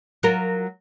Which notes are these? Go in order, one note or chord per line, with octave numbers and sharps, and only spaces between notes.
F#3 F4 A#4